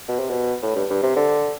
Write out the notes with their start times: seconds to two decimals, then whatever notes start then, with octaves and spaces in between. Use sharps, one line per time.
0.09 B2
0.19 C3
0.30 B2
0.63 A2
0.76 G2
0.90 G2
1.03 C3
1.16 D3